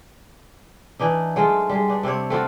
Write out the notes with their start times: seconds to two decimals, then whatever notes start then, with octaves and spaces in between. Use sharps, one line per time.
0.99 E3 D4 D#4
1.36 F#3 G#3 A3 F4
1.70 G3 G#3
1.88 B3 D4
2.03 C3 C4 D4 C#5
2.30 A3 C4 F4 F#4